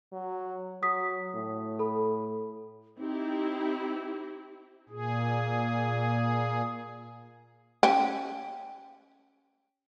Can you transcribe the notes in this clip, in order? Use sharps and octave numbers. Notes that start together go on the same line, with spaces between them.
F#3
F#3 D#6 B6
A2
A4 B5
C4 D#4 E4 G4
A#2 G#4
C#4 G4